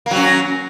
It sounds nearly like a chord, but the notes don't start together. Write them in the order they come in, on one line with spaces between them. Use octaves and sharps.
A#3 F#3 C#4